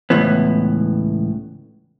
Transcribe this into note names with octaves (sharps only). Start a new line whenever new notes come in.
C#2 A2 E3 B3